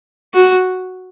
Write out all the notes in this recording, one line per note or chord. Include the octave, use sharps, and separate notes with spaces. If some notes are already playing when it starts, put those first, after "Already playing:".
F#4